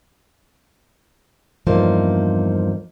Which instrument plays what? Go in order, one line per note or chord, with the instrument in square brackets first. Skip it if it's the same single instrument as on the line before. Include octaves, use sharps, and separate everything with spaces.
[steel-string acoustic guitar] E2 G2 F3 A#3 D#4 C5